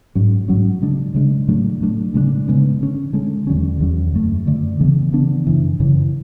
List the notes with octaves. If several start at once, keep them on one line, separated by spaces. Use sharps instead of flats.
G#2 F#3 C#4
G#2 F#3 C#4
C#3 G#3 D4
C#3 G#3 D4
A2 F#3 A3 D4
A2 F#3 A3 D4
C#3 G#3 B3 D4
C#3 G#3 B3 D4
D3 G#3 C#4
D3 G#3 C#4
E2 D3 F#3 C#4
E2 D3 F#3 C#4
F#2 D3 A3
F#2 D3 A3
C#3 E3 B3 D4
C#3 E3 B3 D4
F#2 C#3 E3
F#2 C#3 E3